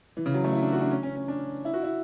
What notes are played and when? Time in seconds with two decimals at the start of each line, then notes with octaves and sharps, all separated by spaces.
0.17 E3
0.26 C#3
0.34 F#3
0.44 A3
0.53 E4
0.62 D4
0.72 F#4
0.81 D4
0.91 C#4
1.03 C#4
1.16 C#4
1.28 D4
1.65 E4
1.74 F#4
1.84 E4